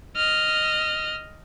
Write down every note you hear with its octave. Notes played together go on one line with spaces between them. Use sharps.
D#5 F6